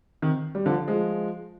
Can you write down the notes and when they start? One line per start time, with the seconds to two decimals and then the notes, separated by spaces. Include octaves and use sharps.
0.22 C3 D#3
0.55 G3
0.66 D3 F3
0.88 F3 G#3